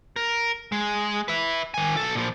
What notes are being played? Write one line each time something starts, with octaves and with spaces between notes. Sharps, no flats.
A#4
G#3
B4 E5
D#3 G#5
B1 A4
A#2 F3